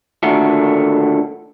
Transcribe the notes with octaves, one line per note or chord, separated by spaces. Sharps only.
A#2 D3 D#3 A3 A#3 F#4